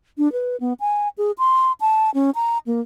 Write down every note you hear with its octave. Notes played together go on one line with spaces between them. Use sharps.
D4
B4
B3
G#5
G#4
C6
A5
C#4
A#5
A#3